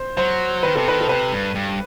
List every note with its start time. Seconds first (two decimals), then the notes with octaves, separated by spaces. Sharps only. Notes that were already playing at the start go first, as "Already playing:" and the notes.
Already playing: C5
0.17 F#3 C5
0.63 D#3 B4
0.75 C3 A4
0.88 D#3 B4
1.01 A4
1.09 C3 B4
1.32 G2
1.55 G2